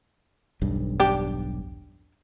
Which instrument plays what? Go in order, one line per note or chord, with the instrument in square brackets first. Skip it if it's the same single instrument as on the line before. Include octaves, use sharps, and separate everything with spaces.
[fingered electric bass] E1 B1 G2
[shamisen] D4 G4